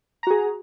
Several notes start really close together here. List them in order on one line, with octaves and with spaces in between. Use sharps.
A#5 F#4 G#4